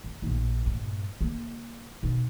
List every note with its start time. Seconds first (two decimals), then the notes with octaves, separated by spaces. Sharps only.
0.04 F2
0.22 A#1 D#4
0.66 G2 A#2
1.21 C#3 A#3
2.03 B2 D#4